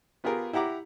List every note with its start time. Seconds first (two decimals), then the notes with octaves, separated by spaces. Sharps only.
0.24 B3 F4 G4 G#4 A#4
0.53 E4 G4 F#5 A#5 D6